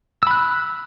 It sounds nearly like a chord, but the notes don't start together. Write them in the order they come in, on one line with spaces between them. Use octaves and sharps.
E6 B5 F#6